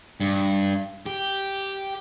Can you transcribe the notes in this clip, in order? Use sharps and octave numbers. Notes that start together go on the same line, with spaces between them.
G2
G4